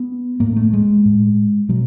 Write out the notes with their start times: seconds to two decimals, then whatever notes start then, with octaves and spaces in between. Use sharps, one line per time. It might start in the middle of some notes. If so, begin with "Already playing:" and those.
Already playing: B3
0.40 A2 A#3
0.56 A3
0.73 G#3
1.05 A2
1.69 B2 F#3